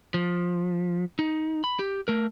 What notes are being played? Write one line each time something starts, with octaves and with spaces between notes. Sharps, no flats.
F3
D#4
B5
G4
A3 A#4